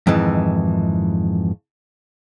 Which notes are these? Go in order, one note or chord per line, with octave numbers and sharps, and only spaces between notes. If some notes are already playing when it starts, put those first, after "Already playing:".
F2 G#2 D#3 E3